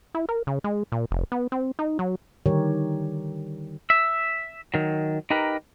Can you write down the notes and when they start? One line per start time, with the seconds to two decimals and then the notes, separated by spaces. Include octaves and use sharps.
0.15 E4
0.29 A#4
0.47 C#3
0.64 G#3
0.92 A#2
1.11 F1
1.32 B3
1.52 C4
1.79 D#4
1.99 F#3
2.46 D3 D#3 G3 G4 A#4 C#5
3.90 E5
4.74 D#3 F#3
5.30 D#4 G4 A#4 B4